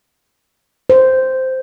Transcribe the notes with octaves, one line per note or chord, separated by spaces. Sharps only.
C5